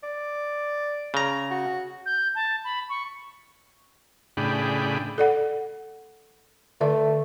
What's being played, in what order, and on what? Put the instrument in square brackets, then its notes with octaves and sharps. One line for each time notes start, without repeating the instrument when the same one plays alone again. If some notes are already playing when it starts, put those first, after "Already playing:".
[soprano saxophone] D5
[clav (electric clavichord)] C#3 A#5
[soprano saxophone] F#4
[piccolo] G6
A5
B5
C#6
[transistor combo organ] A2 C#3 D4 G#4 G5 B5
[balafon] A4 D5 F#5
[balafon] D3 D5 E5 [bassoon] A3